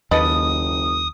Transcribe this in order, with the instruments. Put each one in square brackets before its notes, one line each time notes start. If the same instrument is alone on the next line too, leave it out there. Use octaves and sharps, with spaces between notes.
[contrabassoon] F#1 [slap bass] D#2 [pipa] A4 B4 D#5 [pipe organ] D#6